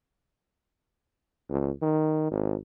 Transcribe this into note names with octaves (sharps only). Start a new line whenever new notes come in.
C#2
D#3
G#1